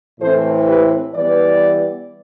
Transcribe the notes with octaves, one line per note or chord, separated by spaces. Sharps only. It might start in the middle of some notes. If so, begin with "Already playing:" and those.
A2 E3 A3 C4 A4 C5
G4 B4
E3 G3 B3 B4 D5